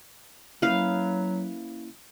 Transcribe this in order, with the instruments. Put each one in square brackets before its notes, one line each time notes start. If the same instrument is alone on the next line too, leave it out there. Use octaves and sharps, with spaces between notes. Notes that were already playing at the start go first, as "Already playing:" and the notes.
[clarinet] F#3 [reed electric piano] A#3 C#4 E4 [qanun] B4 F5